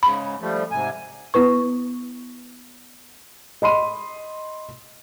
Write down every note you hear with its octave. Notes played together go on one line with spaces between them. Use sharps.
G#2 C#3 B5
F3 G3 A3
G#2 C3 G#5
B3 E4 B4 C#6
D#5 B5 C6 D#7